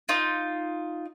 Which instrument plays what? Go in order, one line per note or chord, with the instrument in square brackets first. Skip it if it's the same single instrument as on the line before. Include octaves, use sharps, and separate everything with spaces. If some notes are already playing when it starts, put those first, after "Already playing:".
[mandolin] D#4 F4